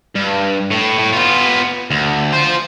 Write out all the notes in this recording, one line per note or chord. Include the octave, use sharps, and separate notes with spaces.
G2
A2
A2
B3 F4
D2
F4 C5